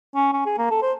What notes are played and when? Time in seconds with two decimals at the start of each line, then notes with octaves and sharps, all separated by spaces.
0.15 C#4
0.33 C#4
0.46 G#4
0.58 A#3
0.70 A4
0.82 C5